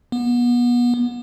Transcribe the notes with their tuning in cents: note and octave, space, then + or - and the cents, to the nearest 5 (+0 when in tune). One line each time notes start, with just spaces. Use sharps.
B3 -30